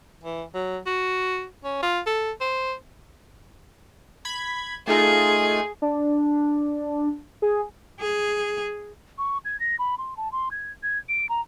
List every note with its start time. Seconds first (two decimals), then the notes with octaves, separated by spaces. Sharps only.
0.24 E3
0.54 F#3
0.86 F#4
1.64 C#4
1.83 F4
2.06 A4
2.41 C5
4.25 B5 G#6
4.87 A3 D#4 F4 G#4
5.82 D4
7.42 G#4
8.00 G#4
9.18 C#6
9.45 G#6
9.60 A#6
9.79 B5
9.98 C6
10.17 A5
10.32 C6
10.51 G#6
10.83 G#6
11.09 D7
11.29 A#5